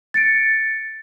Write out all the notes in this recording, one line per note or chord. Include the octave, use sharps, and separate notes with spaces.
A6 C#7 D7